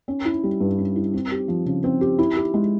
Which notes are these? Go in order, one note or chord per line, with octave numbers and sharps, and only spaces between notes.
C#4
E4
G3
G2
C#4
E4
C4
G4
F3
C#3
C4
G4
E4
G4
G#3